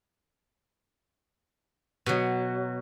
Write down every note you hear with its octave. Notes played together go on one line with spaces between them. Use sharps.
B2 F#3